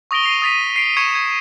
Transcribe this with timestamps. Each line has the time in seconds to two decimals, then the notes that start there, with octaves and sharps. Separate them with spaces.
0.11 C#6 D#6 A#6 D7 G7
0.23 C7 D#7 F7
0.42 D#6 A6 B6 D#7
0.76 C7 D7
0.97 C#6 G#6 C#7 E7
1.15 G#6